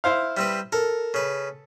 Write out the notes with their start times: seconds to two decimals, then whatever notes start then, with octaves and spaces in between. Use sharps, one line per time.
0.04 E4 C5 F5
0.37 G3 C4 B4
0.72 A4 A#4
1.14 C#3 B4